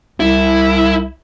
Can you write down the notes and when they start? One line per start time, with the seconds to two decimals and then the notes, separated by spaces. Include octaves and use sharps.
0.20 C2 E4